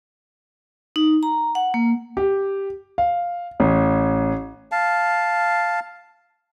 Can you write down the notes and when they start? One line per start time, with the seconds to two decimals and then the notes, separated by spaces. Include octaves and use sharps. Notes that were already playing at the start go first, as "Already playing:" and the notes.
0.96 D#4
1.23 A#5
1.55 F#5
1.74 A#3
2.17 G4
2.98 F5
3.60 A1
4.72 F5 A5